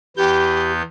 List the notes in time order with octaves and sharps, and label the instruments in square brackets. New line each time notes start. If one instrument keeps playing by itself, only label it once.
[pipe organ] E2 B3 G6 [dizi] G4